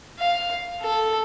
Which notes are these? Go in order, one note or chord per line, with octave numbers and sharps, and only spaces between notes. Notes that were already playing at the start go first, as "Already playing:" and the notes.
F5
A4